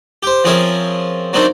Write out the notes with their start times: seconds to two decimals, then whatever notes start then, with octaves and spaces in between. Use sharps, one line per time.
0.23 G4 C5
0.44 F3 C4 C#4 G#4 A#4 E5
1.33 F#3 A#3 C4 D4 D#4